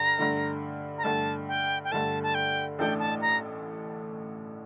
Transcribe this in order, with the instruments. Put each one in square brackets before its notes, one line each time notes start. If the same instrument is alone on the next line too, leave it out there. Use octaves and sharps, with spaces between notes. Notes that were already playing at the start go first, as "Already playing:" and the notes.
Already playing: [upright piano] G2 D3 [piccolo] A#5
[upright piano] G2 D3 A3
[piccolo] A#5
[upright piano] G2 D3 A3 [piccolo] A5
[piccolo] G5
G5
[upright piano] G2 D3 A3 [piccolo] A5
[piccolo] A5
G5
[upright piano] A1 A2 A3 D4 A4 [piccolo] G5
[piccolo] A5
A#5